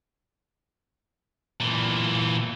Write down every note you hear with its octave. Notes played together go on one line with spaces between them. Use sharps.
A#2 E3